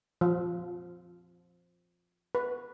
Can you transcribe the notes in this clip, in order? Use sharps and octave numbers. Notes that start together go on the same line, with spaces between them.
F3
B4